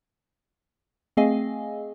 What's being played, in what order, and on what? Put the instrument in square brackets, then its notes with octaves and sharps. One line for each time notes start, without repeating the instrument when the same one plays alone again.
[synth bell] A3 C4 G#4 D#5 F5 G#5